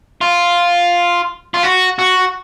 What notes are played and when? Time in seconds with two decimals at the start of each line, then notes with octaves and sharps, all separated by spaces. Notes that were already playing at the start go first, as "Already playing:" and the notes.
0.21 F4
1.54 F4
1.63 F#4
1.99 F#4